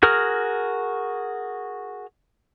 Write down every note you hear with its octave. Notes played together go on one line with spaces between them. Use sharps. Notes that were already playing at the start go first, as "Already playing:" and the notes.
F#4 G#4 A#4 F6